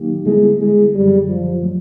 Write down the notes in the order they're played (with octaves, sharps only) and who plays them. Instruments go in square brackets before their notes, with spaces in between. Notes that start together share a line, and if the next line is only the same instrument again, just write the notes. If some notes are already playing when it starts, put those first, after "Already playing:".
Already playing: [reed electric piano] D#3 F#3 A#3 D#4 G4
[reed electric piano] D3 G3 B3 E4 A4 [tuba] G#3
[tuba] G#3
[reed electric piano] F#2 D3 F#3 [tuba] G3
[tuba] F3
[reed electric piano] F#3 A3